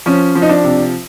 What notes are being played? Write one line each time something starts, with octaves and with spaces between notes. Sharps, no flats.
F3 C#4
F3
D#4
D4
C3